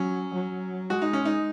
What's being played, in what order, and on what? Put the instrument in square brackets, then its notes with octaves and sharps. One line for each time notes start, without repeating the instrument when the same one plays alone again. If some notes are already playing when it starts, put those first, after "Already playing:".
Already playing: [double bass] F#3 [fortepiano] C#4
[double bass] F#3
[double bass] G#3 [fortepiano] F#4
[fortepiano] D#4
C#4
D#4